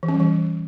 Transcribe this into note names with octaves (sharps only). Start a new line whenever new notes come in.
E3
C#4
G3
E3